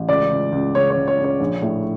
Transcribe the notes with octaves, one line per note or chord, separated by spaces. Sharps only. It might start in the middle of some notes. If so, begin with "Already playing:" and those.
Already playing: A1
C#2 D5
C#2
C#2
C#3 C#5
C#5
C#2
C#5
C#3
C#5
A#1
A2